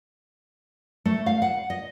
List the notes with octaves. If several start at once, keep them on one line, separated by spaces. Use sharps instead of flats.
A3
F5
F#5
D#5